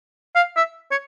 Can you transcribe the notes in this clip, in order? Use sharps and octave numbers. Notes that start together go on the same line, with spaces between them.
F5
E5
C#5